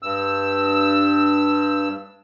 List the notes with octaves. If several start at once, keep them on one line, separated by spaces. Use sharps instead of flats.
G2 E6